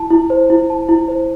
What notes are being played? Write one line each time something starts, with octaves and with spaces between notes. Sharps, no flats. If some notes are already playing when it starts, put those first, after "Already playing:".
Already playing: E4 A5
E4
C5
E4
A5
E4
C5